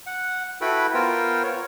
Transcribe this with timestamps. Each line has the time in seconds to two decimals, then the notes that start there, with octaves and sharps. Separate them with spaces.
0.07 F#5
0.61 E4 F#4 A4 B4 G5 B5
0.94 B3 F4 A#4 C5 G5
1.43 C#5